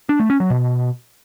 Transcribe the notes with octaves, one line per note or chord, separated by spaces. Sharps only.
D4
A3
C#4
F#3
B2